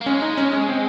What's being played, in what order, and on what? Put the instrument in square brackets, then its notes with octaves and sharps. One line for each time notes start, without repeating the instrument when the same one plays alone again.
[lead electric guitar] A#3
[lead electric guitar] G#3 [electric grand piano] C#4
[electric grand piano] D#4
C#4
C#4
C4